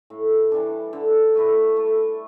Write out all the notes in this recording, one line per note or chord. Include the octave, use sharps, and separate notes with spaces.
A2
E3 G3 D4
D3
A3 E4 B4
A3